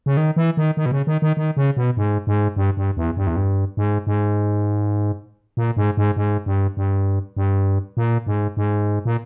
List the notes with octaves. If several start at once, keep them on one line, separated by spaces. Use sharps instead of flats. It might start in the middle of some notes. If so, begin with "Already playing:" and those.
C#3
D#3
E3
D#3
D#3
B2
C#3
D#3
D#3
D#3
C#3
B2
G#2
G#2
G2
G2
E2
G2
E2
G2
G#2
G#2
A#2
G#2
G#2
G#2
G2
G2
G2
A#2
G#2
G#2
A#2